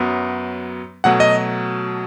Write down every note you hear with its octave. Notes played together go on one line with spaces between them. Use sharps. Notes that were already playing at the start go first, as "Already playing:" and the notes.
Already playing: F#2 F#3 B3
B2 F#3 A3 F#5
D#5